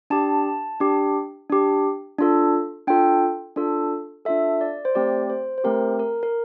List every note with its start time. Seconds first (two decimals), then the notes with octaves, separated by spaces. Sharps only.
0.10 D4 G4 A5
0.80 D4 G4
1.50 D4 G4
2.19 D4 F4 A4
2.87 D4 F4 A4 G5
3.56 D4 F4 A4
4.25 D4 F4 A4 E5
4.61 D5
4.85 C5
4.95 A3 C4 G4 D5
5.30 C5
5.58 C5
5.64 A3 C4 G4 A#4
6.00 A#4
6.23 A#4